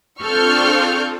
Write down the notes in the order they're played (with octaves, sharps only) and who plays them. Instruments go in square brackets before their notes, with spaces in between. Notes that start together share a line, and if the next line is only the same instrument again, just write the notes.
[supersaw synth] C4 D4 F4 [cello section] A4 [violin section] C#6 F6 G6